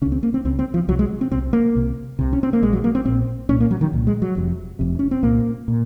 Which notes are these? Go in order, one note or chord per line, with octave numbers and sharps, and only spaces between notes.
C#2 C#3 C#4
C4
A#3
C4
C#2 C#3 C4
C4
F3
C2 C3 F#3
G#3
C4
C2 C3 C4
A#3
C2 C3
C2 C3
C#4
C4
A#3
A#1 A#2 G#3
F#3
A#3
C4
A#1 A#2 C4
C2 A#2 C#4
A#3
F#3
D#3
C2 A#2
G#3
F#3
F1 F2 C3
F1 F2 C3
C#4
C4
C2 A#2 A#3
A#2